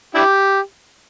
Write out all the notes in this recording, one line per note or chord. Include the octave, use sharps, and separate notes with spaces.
D4 E4 G4